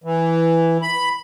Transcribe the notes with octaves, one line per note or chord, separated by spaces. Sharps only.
E3
B5